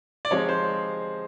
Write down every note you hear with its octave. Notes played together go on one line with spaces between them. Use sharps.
D5
C3 F3 G#3 C4 D#4 C#5
C5